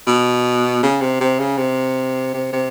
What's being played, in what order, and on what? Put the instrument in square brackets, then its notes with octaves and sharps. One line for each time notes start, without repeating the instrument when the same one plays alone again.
[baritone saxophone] B2
C#3
C3
C3
C#3
C3
C3
C3